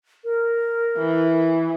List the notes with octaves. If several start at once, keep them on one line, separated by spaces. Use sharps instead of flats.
A#4
E3